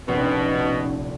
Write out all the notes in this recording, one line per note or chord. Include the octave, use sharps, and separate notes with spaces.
F1 A#1 B2 C#4 D#4